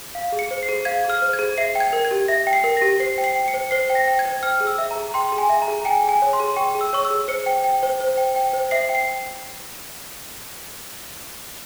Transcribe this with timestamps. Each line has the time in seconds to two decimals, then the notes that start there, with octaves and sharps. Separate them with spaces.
0.15 F5
0.32 G#4
0.39 C#7
0.51 C5
0.63 C7
0.69 G#4
0.85 F5 G#6
1.04 G#4
1.10 F6
1.22 C5
1.33 G#6
1.39 G#4
1.58 E5 C7
1.75 G5
1.80 G#6
1.93 A#4
2.05 G#6
2.11 G4
2.28 E5 A#6
2.47 G5
2.53 C7
2.64 A#4
2.77 G4 A#6
3.00 C5 C7
3.18 G5
3.24 C7
3.35 G5
3.48 C#7
3.54 C5
3.71 C5 C7
3.90 G5
3.95 A#6
4.08 G5
4.19 G#6
4.25 C5
4.43 G5 F6
4.60 G#4
4.67 E6
4.78 E5
4.91 A#5
4.96 G#4
5.14 G5 C6
5.32 G#4
5.38 G#5
5.49 E5
5.62 A#5
5.68 G#4
5.85 G5 G#5
6.04 G#4
6.09 G#5
6.22 C#5
6.33 C6
6.40 G#4
6.56 G5 C#6
6.75 G#4
6.81 E6
6.93 C#5 C#6
7.05 E6
7.10 G#4
7.28 C5 C#7
7.46 G5
7.64 G5
7.83 C5
8.00 C5
8.18 G5
8.36 G5
8.53 C5
8.71 E5 C7
8.89 G5
8.95 C7